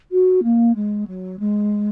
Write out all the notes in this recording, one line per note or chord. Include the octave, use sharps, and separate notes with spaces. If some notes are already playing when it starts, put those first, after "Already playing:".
F#4
A#3
G#3
F#3
G#3